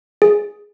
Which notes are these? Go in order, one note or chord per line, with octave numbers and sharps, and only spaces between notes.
G#4